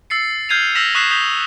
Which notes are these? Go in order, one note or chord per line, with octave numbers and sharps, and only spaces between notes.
E6 A6 C7 C#7
F6 G6 G#6 C7 D#7 F7
E6 F6 A#6 B6 E7 F7
C#6 D#6 F#6 B6 C7 E7
D#6 G6 B6 F7 G7